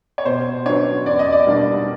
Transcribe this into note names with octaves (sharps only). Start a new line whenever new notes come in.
C#5
B2 C5
F#3 B3 D4 C#5
E2 D5
D#5
D5
B2 G3 A#3 D4